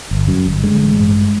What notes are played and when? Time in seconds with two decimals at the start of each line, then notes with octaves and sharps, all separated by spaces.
0.11 G1
0.28 F#2
0.46 G1
0.63 D3 G#3
0.82 A1
0.99 G2